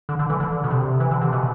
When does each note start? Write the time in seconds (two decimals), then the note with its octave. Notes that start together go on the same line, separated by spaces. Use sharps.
0.09 D3
0.19 D3
0.30 E3
0.40 D3
0.64 B2
0.71 C3
1.00 E3
1.11 D3
1.21 C3
1.32 B2